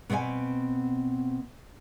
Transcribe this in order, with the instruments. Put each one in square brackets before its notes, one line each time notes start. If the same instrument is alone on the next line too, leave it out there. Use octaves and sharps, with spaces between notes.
[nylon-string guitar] B2 B3 C4 E5 G#5